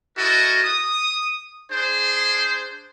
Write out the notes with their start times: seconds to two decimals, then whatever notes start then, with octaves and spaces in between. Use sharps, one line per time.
0.17 E4 F#4 A4 A#4 D#5
0.64 D#6
1.72 D4 G#4 C5